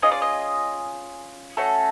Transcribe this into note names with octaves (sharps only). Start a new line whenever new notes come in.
C#4 F4 G#4 D#5
D5
D#5
A3 C#4 F#4 A4